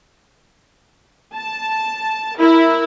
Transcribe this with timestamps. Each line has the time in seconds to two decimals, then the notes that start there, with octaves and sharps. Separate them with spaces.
1.35 A5
2.39 E4 A#4